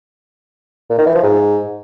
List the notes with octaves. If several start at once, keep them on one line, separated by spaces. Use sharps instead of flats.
A#2
D#3
E3
F3
G#2